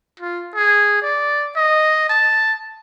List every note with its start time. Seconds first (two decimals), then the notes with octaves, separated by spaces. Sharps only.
0.20 F4
0.55 G#4
1.03 D5
1.56 D#5
2.10 A5